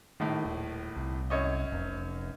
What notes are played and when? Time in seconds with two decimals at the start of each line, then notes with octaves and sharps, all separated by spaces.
0.20 A#1 A2 D#3
0.45 D#1
0.97 C2
1.30 F#2 C#5 D#5
1.72 F1